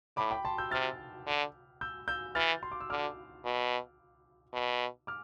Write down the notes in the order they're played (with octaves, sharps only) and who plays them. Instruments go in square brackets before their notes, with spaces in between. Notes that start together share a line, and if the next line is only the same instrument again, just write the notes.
[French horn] A2 [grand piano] B5 D6
[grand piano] G5 B5
A5 C6
E6 G6
[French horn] C3 [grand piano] F6 A6
[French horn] D3
[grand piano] E6 G6
E6 G6
[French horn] E3 [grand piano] F6 A6
[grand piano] C6
D6
E6
[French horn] D3 [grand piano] D6 F6
[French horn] B2
B2
[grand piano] D6 F6